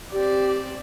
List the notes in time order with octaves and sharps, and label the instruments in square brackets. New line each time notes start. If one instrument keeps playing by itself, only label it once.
[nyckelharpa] C4 D5 [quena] G4